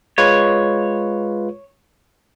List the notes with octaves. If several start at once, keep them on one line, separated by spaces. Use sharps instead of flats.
G#3 F4 B4 C#5